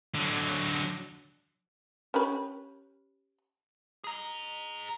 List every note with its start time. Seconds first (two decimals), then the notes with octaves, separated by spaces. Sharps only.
0.15 D3 F#3
2.14 C#4 G4 B4
4.04 G#4 A#5